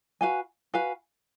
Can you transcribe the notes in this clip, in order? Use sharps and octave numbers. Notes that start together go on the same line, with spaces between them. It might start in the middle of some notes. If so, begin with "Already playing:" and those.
F#4 B4 F5 G#5
F#4 B4 F5 G#5